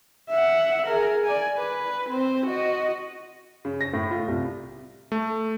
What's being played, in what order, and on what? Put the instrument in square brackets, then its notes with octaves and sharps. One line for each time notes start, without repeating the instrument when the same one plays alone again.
[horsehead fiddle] E5 F#5
G#4 A#4
D5 G#5
B4
C4 C5
F#4 D#5
[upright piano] C#3
A#6
A2
F4
C2
[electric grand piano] A3